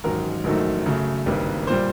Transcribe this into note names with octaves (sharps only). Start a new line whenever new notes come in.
A1 G#2 D#3 F#3 A#4
A#1 G#2 D#3 F#3 A3
F#2 C#3 F#3 A3
G#1 G2 D#3 G3 A#3
A#2 G3 C5